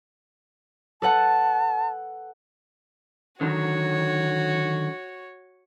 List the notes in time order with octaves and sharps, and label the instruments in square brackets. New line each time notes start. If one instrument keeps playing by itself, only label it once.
[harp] A4 B4 F#5 [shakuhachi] A5
[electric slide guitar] D3 D#3 F#3 [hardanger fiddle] F#4 C#5